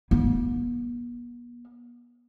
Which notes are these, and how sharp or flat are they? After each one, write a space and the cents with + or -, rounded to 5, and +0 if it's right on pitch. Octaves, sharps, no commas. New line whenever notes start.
B3 -45